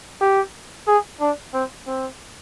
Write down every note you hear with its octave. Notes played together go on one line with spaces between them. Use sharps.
G4
G#4
D4
C4
C4